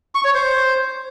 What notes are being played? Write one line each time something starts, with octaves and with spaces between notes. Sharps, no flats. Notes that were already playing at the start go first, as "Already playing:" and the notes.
C#6
C#5
C5